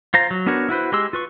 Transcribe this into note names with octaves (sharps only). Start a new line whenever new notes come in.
F4 C5 A#5
F#3
B3 D4 F#4 A#4 C#5
E4 F#4 B4 C5
G#3 G4 G#4 C6 E6
F4 B4 C#6